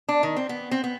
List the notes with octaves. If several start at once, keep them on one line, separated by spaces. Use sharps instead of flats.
D4
D#3
C4
B3
C4
B3